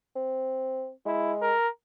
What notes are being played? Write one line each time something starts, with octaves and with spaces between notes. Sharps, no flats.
C4
G#3 E4
A#4